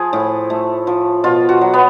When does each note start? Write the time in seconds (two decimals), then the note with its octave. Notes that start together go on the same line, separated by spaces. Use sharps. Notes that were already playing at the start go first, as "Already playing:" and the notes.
Already playing: F3 G#4
0.13 A2
0.50 A3
0.87 F3
1.24 B2 F4
1.49 F#4
1.61 F#3
1.74 B3